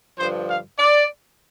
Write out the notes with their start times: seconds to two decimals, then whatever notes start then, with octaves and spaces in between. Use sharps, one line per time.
0.18 G2 D3 F3 C5
0.47 F5
0.78 D5